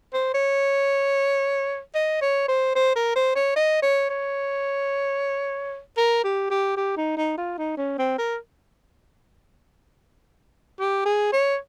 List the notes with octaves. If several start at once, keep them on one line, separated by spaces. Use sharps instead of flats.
C5
C#5
D#5
C#5
C5
C5
A#4
C5
C#5
D#5
C#5
C#5
A#4
G4
G4
G4
D#4
D#4
F4
D#4
C#4
C4
A#4
G4
G#4
C#5